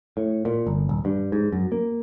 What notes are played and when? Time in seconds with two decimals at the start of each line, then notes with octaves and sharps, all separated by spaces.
0.17 A2
0.45 A#2
0.67 G1
0.89 D#1
1.05 G2
1.32 G#2
1.52 F#2
1.72 A#3